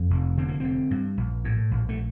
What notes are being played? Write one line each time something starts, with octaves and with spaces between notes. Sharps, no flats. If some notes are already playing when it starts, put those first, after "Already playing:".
Already playing: F2
F1
D3 C4
A#3
D3 C4
G2
A#1
A2
A#1
A3